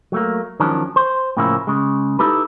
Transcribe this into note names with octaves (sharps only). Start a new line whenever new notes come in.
F#3 A3 A#3
D#3 F3 F#3 G#3 C#4 D4
C5
A2 C#3 F3 A#3 C#4 E4
C#3 G#3
D#4 E4 G4 A4 B4